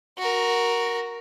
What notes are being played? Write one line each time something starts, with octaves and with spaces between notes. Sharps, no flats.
F#4 A#4